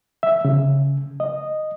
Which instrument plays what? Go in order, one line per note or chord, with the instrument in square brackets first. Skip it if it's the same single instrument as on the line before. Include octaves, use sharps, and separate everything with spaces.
[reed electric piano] E5
C#3
D#5